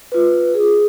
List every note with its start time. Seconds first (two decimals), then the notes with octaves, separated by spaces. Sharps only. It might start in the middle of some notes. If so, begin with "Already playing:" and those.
0.12 F4 B4
0.54 G#4